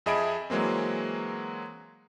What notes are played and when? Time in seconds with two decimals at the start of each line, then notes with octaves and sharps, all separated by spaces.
0.06 F2 G#4 D#5 E5 B5 D7
0.50 E3 F#3 G#3 A#3 C4